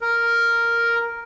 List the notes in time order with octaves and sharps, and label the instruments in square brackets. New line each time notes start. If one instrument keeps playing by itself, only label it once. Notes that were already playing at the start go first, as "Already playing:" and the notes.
[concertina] A#4